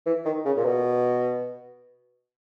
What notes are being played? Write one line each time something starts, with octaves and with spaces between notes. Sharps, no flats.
E3
D#3
C#3
A#2
B2